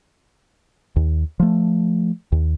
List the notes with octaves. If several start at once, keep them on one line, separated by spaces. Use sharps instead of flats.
D#2
F3 A3
D#2